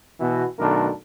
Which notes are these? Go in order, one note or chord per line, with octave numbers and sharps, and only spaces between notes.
B2 E3 B3 F#4
B1 D#3 A3 D4 A#4